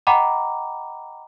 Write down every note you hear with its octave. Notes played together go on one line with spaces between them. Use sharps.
D#5 F#5 G5 A#5 B5 D6